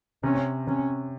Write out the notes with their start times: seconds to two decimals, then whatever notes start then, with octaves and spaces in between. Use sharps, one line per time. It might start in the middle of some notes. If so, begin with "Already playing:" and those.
0.23 C3 C#4
0.67 C3 C#4